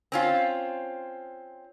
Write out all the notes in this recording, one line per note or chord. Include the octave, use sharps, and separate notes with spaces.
C4 C#4 F4